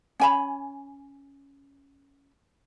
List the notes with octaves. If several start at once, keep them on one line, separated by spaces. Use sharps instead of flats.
C#4 G#5 B5